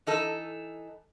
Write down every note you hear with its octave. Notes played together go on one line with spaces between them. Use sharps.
E3 D#4 A4